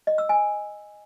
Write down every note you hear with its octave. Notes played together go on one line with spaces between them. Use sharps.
D#5
E6
G#5